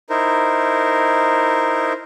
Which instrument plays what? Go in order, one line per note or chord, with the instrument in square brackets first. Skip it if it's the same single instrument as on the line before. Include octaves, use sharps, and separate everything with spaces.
[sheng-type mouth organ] D#4 E4 A#4 C5